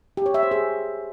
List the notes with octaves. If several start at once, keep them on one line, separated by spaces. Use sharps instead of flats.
G4
C#5
E5
C5
G#4